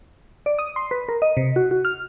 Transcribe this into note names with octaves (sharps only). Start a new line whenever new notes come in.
D5
D#6
C6
B4
A#4
D#5
C3
F#4
F#4
F6